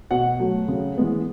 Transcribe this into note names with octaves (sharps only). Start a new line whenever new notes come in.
B2 F#5
F#3 A3
C#3
E3 G#3 B3